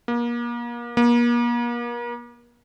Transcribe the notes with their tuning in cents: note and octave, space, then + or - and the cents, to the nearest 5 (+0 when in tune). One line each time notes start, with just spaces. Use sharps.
A#3 +35
A#3 +40